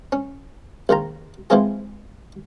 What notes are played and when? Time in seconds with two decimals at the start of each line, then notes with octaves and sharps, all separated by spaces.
0.12 C#4
0.89 A#1 D#3 F4 A#5
1.50 E3 F3 G#3 C4 F4 G#4